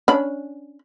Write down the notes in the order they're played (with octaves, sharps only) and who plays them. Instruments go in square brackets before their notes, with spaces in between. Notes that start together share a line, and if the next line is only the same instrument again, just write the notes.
[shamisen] C#4 D4 B5